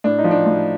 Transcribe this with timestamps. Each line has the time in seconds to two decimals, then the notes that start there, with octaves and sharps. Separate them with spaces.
0.04 A2 D4
0.19 D#4
0.24 F3
0.31 D4
0.46 A2